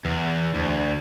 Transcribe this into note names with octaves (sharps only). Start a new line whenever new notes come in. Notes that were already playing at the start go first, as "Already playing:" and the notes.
E2
D2